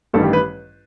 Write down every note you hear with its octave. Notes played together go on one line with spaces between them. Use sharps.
A1 G2 D#3 G3 A4
G4
B4